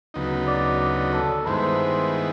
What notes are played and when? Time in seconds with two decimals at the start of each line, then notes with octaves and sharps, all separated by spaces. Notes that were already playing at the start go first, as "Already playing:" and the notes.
0.14 D2 C#3 F#3 B3 D#4
0.47 D5
0.80 D5
1.13 A4
1.46 G2 D#3 G#3 B3 E4 C5